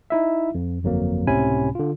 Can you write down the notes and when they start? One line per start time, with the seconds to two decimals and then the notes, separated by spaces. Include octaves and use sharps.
0.10 D#4 E4 E5
0.54 F2
0.83 G1 F2 F#3 A#3
1.27 C#2 A2 C3 C#4 G#5 B5
1.75 D3 F4